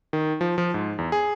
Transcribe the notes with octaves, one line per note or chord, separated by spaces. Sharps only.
D#3
F3
F3
G#2
E2
G#4